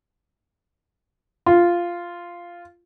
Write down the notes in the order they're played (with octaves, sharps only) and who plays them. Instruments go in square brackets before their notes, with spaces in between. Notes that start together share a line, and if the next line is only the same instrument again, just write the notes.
[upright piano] F4